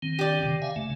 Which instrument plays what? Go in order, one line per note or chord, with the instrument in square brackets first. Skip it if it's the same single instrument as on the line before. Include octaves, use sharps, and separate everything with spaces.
[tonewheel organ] D#3 C4
[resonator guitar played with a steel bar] G4 D5
[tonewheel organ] C3 D#3
E5 F5 G#5
C#3 A3